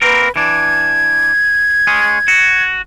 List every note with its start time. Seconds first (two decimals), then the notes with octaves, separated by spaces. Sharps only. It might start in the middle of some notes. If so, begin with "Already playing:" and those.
0.02 A#3 C4 A#4 B4
0.36 E3 D4 G#6
1.87 G#3 C#4 G#4
2.28 F#4